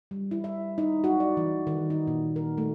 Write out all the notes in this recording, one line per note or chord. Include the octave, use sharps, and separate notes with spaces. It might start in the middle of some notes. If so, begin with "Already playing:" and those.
G3
E4
E5
D#4
F#4
D5
E3
D#3
D#4
A#2
A#4
A3